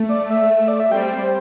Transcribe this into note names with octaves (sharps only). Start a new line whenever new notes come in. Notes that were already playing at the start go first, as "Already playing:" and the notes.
Already playing: A3
D5
E5
D5
E5
G3 C4 G5
C5